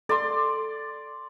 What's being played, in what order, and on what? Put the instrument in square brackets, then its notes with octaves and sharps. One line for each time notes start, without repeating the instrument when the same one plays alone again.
[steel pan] A4 [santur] D5 C6